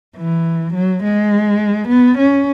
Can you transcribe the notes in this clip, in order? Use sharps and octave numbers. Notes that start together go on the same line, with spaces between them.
E3
F#3
G#3
B3
C#4